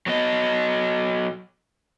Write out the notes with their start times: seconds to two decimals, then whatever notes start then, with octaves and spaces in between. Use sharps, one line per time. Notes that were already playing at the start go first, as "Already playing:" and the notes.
0.06 F#3 B3 D#5